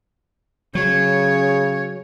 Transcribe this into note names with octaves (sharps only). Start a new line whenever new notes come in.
C#3 F#3 C#5